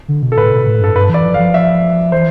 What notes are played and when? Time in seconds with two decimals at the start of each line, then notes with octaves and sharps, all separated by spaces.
0.08 D3
0.22 B2
0.32 A4
0.36 A2 B4
0.51 B2
0.67 A2
0.80 G2 A4
0.95 G2 B4
1.09 E3 D5
1.25 F3
1.34 F5
1.39 F3
1.54 E5
2.12 E3 C5